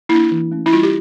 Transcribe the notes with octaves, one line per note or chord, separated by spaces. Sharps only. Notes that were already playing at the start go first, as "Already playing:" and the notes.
A#3 D4 E4
E3
A3 C#4
E4
G3 F4
G4